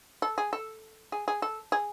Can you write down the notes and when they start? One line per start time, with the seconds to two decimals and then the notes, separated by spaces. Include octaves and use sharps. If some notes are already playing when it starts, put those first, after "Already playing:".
0.22 A4
0.38 G#4
0.53 A4
1.12 G#4
1.28 G#4
1.42 A4
1.72 G#4